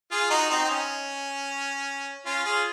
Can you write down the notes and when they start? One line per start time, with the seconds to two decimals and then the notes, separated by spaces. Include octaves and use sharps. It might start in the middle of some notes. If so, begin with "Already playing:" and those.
0.11 F4 G#4
0.30 D#4 F#4
0.50 C4 D#4
0.65 C4
0.69 C#4
2.26 C#4 F4
2.44 F4 G#4